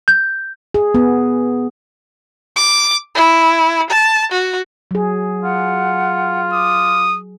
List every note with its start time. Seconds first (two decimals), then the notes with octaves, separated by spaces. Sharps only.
0.08 G6
0.74 G#4
0.95 B3
2.56 D6
3.15 E4
3.90 A5
4.31 F#4
4.91 F#3 G#4
5.42 F4 F#5
6.53 D6 D#6